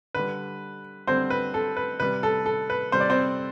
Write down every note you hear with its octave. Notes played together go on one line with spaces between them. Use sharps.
D3 G3 B4
D3 G3 C4 C5
B4
A4
B4
C3 G3 B4
A4
A4
B4
C3 G3 C5
D5
C4 C5